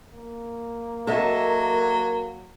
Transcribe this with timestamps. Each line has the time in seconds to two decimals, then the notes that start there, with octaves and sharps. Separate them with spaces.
0.12 A#3
1.07 F#3 A4 A#4 D#5 E5